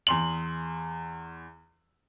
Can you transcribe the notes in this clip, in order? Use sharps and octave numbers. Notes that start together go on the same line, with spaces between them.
E2 C6 F#7